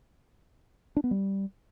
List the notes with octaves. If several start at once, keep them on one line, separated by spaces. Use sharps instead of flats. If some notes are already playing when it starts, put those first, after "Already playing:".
D4
B3
G3